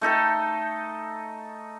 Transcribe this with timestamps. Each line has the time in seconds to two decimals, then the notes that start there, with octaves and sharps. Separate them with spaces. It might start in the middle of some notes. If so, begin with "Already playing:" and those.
0.01 A3 D#4 A4 G5